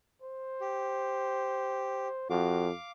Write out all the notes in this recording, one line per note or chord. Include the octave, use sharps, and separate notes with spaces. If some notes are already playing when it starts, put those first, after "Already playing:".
C5
G4
F2 F#4 F5 D6